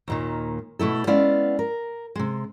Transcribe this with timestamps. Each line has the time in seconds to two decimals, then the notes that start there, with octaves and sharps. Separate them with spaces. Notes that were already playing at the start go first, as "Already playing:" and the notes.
0.08 D#2 A#2 D#3
0.79 B2 A3 E4 A4
1.07 G#3 B3 C#4 E4 D5 F5
1.59 A#4
2.15 C3 G#3